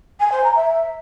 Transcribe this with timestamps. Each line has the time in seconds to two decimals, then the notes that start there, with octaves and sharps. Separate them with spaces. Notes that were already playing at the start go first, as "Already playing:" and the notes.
0.20 G#5
0.32 C5
0.44 A#5
0.56 E5